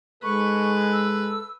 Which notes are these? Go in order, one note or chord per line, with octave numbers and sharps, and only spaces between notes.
G#2 G#3 A4 B4 C#6
E6